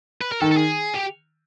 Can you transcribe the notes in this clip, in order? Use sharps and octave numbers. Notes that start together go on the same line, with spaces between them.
B4
A#4
D#3 A4
A4
G#4
G4